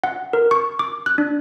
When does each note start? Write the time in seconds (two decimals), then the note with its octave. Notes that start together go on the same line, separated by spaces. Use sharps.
0.04 F#5
0.33 A#4
0.51 C#6
0.79 D6
1.06 F#6
1.18 D4